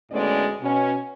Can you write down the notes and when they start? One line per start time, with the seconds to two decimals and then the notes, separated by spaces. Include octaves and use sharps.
0.11 D2 A2 G#3 B3 C#4 D5
0.61 B2 C#4